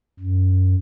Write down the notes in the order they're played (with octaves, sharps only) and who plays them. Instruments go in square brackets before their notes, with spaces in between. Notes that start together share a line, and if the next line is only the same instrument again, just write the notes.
[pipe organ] F#2